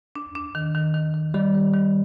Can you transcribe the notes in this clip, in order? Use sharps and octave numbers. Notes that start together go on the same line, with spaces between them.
D4
D4
D#3
D#3
D#3
D#3
D#3 G3
D#3
D#3